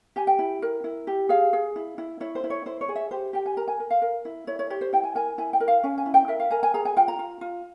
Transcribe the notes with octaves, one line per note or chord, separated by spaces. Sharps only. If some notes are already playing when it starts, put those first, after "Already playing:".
G4 G#5
G5
E4
A#4
E4
G4
G#4 F5
G#4
E4
E4
E4 C#5
C5
E4
C#5
E4 C5
C#5
G#4
E5
G4 C5
G4 G5
G#5
A#4 A#5
G#5
A#4
F5
A#4
E4
E4 C#5
C#5
G4 C#5
C5
E4 G5
G#5
A#4 G#5
E4 G#5
G5
A#4
F5
C#4 G#5
G#5
E4
G5
A#4 E5
F5
A#4 G#5
G#5
G#4 A#5
G#5
F4 G5
A#5
F4
F4